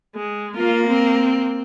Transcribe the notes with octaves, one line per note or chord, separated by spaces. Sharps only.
G#3
A#3 F4
C4